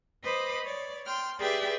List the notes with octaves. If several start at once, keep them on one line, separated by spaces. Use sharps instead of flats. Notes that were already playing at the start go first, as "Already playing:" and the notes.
B4 C5 D#5 B5 D6
C#5 D5
G5 C6 F6
G4 G#4 B4 D5 E5 G5